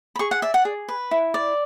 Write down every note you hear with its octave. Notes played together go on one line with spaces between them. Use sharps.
B5
G#4 C#6
F#5
D5 E5
F#5
G#4
B4
E4
D5